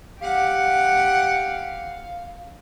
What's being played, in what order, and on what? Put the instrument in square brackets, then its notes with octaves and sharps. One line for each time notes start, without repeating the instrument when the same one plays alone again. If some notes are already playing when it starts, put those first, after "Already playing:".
[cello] G4 F#5 [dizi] F5